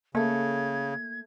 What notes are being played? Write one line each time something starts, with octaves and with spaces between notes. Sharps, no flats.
C#3 A3 A#3 A4 G#6